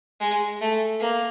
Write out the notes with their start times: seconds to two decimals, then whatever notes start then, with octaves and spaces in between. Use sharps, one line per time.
0.21 G#3
0.61 A3
1.01 A#3